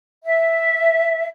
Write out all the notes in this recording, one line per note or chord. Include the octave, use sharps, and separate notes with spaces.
E5